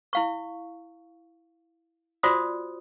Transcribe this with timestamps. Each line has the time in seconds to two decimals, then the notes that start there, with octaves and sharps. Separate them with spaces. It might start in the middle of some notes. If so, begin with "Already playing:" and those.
0.13 E4 F5 C#6
2.23 F4 F#4 C5 D5 D#6